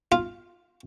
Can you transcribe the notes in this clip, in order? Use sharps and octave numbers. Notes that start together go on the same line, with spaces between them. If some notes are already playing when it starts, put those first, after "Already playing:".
F4